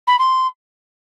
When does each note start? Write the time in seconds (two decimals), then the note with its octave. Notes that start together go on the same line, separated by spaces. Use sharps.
0.07 B5
0.19 C6